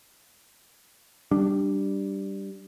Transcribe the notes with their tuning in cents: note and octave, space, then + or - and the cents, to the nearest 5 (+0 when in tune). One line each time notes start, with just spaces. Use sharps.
G3 -5 D4 +0